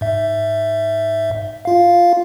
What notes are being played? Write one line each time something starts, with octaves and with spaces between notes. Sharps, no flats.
G#2 E5
F4 F5